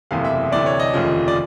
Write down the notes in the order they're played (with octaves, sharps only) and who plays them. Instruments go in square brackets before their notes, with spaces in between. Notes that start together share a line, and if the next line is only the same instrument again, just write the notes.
[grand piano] F#1 E2 C3 E3 A3 F5
E5
D2 C3 E3 A3 D4 D5
C#5
D#5
F1 D#2 C#3 F3
D5